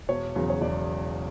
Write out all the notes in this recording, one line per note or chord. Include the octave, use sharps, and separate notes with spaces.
E1 C#5
E2 C#3 F#3
C#5
E1 D5